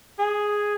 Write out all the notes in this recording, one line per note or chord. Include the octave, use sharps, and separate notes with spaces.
G#4